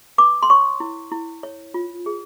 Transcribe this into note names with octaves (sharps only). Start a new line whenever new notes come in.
B4 D6
C6
C#5 C#6
E4
E4
C#5
F4
G#4